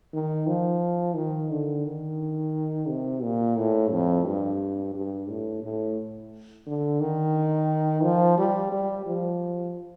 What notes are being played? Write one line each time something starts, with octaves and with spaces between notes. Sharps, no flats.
D#3
F3
D#3
D3
D#3
C3
A#2
A2
F2
G2
G2
A2
A2
D3
D#3
F3
G3
G3
F3